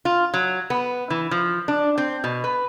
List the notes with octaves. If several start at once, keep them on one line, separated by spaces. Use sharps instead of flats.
F4
F#3
B3
E3
F3
D4
C4
B2
B4